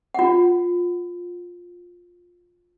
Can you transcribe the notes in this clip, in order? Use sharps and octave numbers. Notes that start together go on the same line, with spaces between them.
F4 F#5